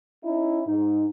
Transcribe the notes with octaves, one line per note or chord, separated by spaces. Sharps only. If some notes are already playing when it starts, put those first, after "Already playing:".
C#4 D#4 E4
G#2 D#4